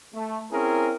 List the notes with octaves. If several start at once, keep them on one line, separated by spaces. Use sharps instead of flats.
A3
C4 C#4 E4 G#4 A#4